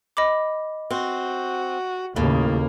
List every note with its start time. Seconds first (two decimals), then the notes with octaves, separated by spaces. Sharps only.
0.17 D#5 B5 D6
0.90 C4 F#4
2.16 D#2 A2 C#3 A#3